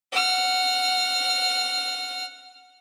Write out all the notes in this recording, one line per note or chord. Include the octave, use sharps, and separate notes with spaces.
F#5 F6